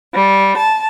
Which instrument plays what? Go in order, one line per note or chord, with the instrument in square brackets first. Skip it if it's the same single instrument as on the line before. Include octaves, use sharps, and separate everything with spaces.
[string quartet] G3
A5